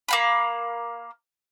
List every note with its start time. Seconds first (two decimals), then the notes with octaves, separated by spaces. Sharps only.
0.08 A#3 F5 B5